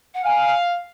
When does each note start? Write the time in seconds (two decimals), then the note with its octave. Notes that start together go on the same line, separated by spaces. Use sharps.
0.14 F#5
0.24 F5 G#5